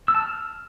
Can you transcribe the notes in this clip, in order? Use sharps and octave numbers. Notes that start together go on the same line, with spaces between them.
E6
A5
F6